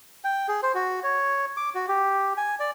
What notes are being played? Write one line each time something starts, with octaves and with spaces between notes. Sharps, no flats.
G5
G#4
C5
F#4
C#5
D6
F#4
G4
G#5
D5